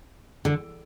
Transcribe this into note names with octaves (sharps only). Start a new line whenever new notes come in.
D3